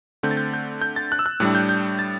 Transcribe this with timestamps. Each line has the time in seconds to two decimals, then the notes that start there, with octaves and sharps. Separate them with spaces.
0.23 D3 A3 C4 G6
0.31 A6
0.37 G6
0.54 G6
0.82 G6
0.96 A6
1.12 F#6
1.19 E6
1.26 F#6
1.40 A2 G3 D4 F#6
1.55 G6
1.69 G6
1.99 A6